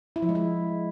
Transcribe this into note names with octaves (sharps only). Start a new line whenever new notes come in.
E4
F3
G#3
E4